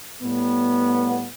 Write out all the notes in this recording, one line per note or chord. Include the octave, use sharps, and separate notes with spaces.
A2 G3 B3